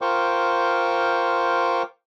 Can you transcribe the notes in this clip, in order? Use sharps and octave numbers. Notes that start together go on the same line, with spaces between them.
F4 A#4 C5 G5 C#6 D6